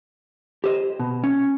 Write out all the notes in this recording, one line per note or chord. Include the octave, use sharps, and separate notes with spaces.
G4 C5 D#5
B2
C#4